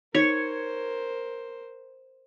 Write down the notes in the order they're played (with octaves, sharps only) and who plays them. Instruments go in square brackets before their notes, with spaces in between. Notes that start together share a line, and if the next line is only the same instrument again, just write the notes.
[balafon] D#4 [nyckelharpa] A#4 C5 [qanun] C#5